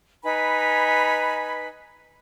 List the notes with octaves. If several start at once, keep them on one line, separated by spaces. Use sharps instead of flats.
D#4 B4 G#5 B5